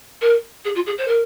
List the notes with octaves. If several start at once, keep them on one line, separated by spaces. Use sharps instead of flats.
A#4
G#4
F4
G#4
C5
A#4